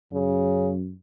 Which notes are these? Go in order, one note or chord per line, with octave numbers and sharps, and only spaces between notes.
F#2 C#3